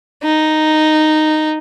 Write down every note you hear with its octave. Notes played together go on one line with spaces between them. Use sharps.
D#4